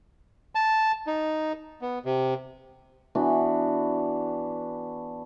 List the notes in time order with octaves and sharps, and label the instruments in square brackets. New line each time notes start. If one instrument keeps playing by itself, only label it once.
[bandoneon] A5
D#4
B3
C3
[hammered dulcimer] E3 B3 D4 F#4